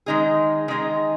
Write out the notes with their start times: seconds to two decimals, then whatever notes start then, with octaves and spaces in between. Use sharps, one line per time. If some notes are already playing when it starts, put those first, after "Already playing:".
0.06 D#3 G#3 D#4 G#4
0.68 D#3 G#3 D#4 G#4